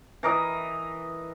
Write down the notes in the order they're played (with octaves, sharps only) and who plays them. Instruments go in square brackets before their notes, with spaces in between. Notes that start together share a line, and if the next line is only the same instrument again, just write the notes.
[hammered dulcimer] E3 A#4 D#5